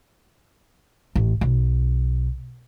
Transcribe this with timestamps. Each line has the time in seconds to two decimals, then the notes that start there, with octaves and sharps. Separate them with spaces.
1.16 A1
1.41 B1